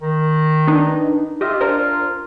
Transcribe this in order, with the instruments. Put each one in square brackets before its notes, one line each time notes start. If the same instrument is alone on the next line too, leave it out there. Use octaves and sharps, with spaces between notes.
[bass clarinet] D#3
[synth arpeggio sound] D4 D#4 B4
[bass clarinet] F4 [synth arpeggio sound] G4 D#5 E5
[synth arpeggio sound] D4 A#4 C5